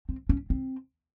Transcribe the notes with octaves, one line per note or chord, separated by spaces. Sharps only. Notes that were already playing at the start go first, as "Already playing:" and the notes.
C4
C#4
C4